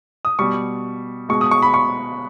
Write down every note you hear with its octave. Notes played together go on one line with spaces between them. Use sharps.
D#6
B2 G3 C#6
B2 G#3 C#6
D#6
C#6
B5
C#6